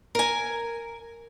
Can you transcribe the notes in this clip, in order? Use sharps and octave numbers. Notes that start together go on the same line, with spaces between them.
A#4 G#5